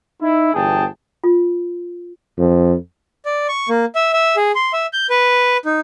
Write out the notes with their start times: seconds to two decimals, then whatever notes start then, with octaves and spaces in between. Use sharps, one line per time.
0.21 D#4 E4
0.54 G1 E2 G#4 G5 A5
1.24 F4
2.38 F2
3.25 D5
3.49 C#6
3.69 A#3
3.95 E5
4.13 E5
4.36 G#4
4.55 C6
4.73 E5
4.93 G6
5.10 B4
5.65 D#4